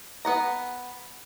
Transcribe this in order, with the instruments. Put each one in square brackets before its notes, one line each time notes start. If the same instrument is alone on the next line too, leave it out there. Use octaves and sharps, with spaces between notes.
[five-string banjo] B3 F#5 A#5